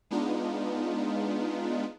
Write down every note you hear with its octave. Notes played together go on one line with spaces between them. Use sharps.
G#3 B3 D4 D#4 F4